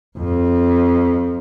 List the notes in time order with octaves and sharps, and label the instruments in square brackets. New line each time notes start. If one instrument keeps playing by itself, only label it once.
[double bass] F2